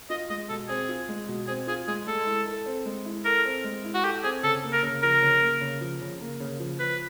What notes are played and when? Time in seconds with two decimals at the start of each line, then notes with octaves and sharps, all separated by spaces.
0.10 F4 D#5
0.30 G#3 D#5
0.49 B2 A4
0.68 C4 G#4
0.89 F4
1.09 G#3
1.28 B2
1.47 C4 G#4
1.67 F4 G#4
1.88 G#3 G#4
2.07 G#3 A4
2.26 E4
2.47 A4
2.66 C4
2.85 G#3
3.05 E4
3.25 A4 A#4
3.45 C4
3.64 G#3
3.84 E4
3.95 F#4
4.04 G4 A4
4.24 C4 G#4
4.43 C#3 A4
4.63 A#3
4.73 A#4
4.83 C#3
5.03 F3 A#4
5.22 C#3
5.42 A#3
5.61 C#3
5.81 F3
6.01 C#3
6.21 A#3
6.40 C#3
6.60 F3
6.80 F3 B4